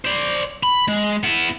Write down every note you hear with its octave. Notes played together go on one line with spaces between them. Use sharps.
C5 D5
B5
G#3
B3 E4